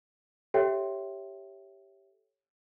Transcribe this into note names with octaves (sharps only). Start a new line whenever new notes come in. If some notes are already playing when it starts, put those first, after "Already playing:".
G4 A4 C#5 E5 G5